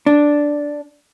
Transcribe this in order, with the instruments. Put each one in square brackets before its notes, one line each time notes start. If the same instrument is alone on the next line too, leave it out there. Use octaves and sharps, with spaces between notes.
[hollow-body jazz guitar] D4